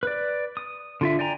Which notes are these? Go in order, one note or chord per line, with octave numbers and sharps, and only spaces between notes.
B4 D5
D#6
D3 F4 E5
D5 G5 G#5 A#5